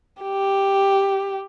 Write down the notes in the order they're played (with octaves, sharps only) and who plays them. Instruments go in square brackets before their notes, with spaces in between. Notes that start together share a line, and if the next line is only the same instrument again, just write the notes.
[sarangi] G4